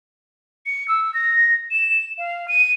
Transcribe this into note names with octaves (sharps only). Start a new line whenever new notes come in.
C#7
E6
A#6
E7
F5
D#7